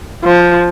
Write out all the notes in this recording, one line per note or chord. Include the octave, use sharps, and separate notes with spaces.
F3